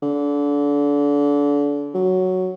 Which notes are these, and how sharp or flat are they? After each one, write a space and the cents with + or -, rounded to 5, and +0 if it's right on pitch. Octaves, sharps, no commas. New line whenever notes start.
D3 -30
F#3 +0